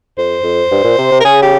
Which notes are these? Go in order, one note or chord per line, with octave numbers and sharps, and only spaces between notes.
F2 C5
F2
G2
A#2
C3
C3
A#4
C#3 G#4
G4